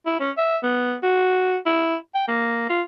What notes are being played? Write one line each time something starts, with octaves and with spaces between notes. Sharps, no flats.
E4
C#4
E5
B3
F#4
E4
G5
A#3
F4